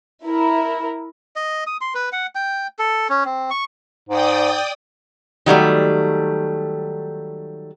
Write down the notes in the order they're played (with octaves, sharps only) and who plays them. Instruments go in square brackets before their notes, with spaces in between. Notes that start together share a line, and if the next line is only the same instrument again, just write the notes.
[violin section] E4 A#4
[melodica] D#5
D#6
C6
B4
F#5
G5
A4
C#4
C4
C#6
[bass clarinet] G#2 [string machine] D5 G5 D#6
[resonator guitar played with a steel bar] D#3 F#3 G3 A3